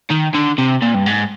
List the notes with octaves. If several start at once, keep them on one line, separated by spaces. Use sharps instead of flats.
D#3
D3
C3
A#2
G2
G#2